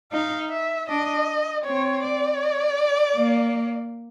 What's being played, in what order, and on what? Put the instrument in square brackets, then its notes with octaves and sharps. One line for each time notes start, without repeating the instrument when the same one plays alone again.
[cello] D#4 [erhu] F5
[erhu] E5
[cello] D4 [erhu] D#5
[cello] C4 [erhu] C#5
[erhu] D5
[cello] A#3